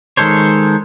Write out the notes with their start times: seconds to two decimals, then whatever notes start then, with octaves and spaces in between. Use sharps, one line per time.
0.17 D#3 G#3 A4 C5 C#5